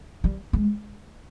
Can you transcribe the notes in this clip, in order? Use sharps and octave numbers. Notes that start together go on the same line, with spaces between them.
G3
G#3